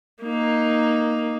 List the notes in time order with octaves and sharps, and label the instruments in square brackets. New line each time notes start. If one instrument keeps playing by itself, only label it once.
[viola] A#3 D#4